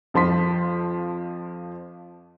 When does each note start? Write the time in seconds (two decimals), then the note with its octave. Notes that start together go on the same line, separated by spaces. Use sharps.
0.14 F2 F3 C6 B6